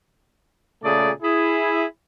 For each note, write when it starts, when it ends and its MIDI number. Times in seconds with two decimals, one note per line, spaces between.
0.83 1.10 46
0.83 1.10 49
0.83 1.10 57
0.83 1.10 68
0.83 1.10 74
1.22 1.83 64
1.22 1.83 68